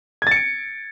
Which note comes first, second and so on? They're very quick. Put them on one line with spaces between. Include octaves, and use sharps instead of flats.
G#6 A6 C#7 D7